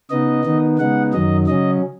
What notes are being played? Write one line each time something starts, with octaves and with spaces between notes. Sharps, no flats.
C#3 B3 D#4 D#5
D#3 B3 D#4
C#3 G#3 B3 D#4 F#5
F#2 D#3 F#3 D#5
C#3 F#3 C#4 D#5